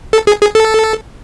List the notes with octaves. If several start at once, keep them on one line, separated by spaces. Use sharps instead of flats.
A4
G#4
G#4
A4